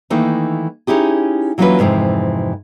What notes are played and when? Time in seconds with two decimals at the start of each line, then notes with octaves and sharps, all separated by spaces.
0.10 D#3 E3 A3 A#3 D#4
0.87 C#4 D#4 E4 G4 G#4
1.58 E3 F#3 A#3 C#4 F4 B4
1.79 F2 G#2 C3 E3